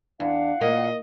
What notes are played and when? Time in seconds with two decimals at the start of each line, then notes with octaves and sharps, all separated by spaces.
0.20 E2 D4 F5 F#5
0.61 A#2 A#3 D#5